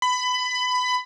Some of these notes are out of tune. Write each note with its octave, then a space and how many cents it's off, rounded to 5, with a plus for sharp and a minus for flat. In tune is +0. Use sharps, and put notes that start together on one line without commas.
B5 +20